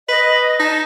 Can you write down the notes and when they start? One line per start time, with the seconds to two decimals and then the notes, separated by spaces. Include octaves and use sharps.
0.09 B4 D#5
0.60 D#4 A5